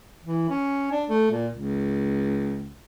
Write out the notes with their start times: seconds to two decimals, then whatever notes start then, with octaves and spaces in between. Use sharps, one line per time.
0.24 E3
0.49 C#4
0.91 D4
1.09 A3
1.31 A#2
1.53 C#2